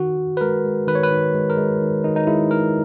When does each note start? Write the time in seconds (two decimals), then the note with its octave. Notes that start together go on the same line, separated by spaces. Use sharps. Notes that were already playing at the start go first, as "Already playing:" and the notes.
Already playing: D#3 F#4
0.17 D#3
0.37 B4
0.41 G#3 A#4
0.65 G#3
0.87 D#3 B4
0.95 C#5
1.03 B4
1.11 D#3
1.34 G#3
1.50 A#4
1.57 G#3
1.81 D#3
2.04 D#3 D#4
2.16 D#4
2.27 G#3 E4
2.51 G#3 A#4